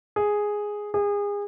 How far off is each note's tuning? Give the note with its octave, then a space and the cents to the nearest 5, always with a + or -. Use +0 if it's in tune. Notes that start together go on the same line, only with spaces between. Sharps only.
G#4 +0
G#4 -30